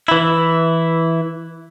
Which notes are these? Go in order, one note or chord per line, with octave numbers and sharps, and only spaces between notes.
E3 E4